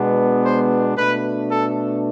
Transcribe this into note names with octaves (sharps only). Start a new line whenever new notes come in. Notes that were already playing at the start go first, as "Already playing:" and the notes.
Already playing: B2 G#3 B3 D4
C5
B2 A3 D4 B4
A4